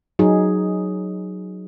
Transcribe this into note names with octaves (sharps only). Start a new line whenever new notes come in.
F#3 D#4 G#4